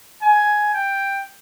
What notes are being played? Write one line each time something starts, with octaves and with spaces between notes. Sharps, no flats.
G#5
G5